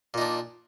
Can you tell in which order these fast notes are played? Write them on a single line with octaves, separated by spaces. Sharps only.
A#2 D#4 D4